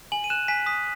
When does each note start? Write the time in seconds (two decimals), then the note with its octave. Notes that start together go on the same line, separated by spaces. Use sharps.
0.12 G#5 F#7
0.24 D#7
0.30 F#6 E7
0.48 G#5 B6
0.66 D#6 B6